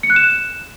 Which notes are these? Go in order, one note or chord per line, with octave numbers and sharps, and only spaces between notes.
C#7
F#6
E7